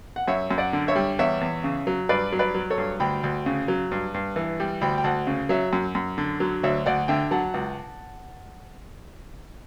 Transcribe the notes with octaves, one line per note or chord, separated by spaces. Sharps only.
F#5
F#2 C#5 E5
F#2
D5 F#5
D3
C#5 E5
G3
E2 C#5 E5
E2
C#3
F#3
G2 B4 D5
F#3
B4 D5
F#3
A4 C#5
G2
D2 G5 B5
D2
C#3
F#3
G2
G2
E3
G3
D2 G5 B5
G5
D2 F#5 A5
C#3
F#3 C#5 E5
F#2
F#2
D3
F#3
D2 C#5 E5
D2 D5 F#5
D3 E5 G5
F#3 F#5 A5
C#2